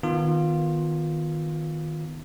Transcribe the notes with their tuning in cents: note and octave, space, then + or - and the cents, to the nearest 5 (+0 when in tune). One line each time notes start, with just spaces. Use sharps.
D#3 +0 B3 +0 F4 +5